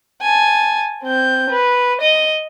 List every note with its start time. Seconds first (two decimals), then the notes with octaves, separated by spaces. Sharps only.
0.22 G#5 A5
1.03 C4 G6
1.50 B4
2.01 D#5